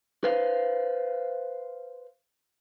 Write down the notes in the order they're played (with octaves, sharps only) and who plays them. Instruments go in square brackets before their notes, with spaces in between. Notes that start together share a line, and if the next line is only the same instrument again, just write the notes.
[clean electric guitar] B4 C5 F5